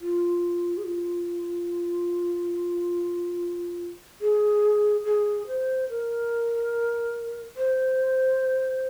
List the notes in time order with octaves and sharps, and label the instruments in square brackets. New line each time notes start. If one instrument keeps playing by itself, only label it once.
[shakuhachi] F4
G#4
F4
G#4
G#4
C5
A#4
C5